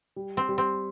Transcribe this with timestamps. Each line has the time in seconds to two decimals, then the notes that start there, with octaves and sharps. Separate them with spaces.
0.16 G3
0.37 C4
0.48 G3
0.58 C4